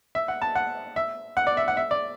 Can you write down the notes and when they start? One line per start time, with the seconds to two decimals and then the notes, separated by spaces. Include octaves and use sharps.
0.15 E5
0.28 F#5
0.42 A5
0.55 F#5
0.96 E5
1.37 F#5
1.47 D5
1.57 E5
1.68 F#5
1.77 E5
1.91 D5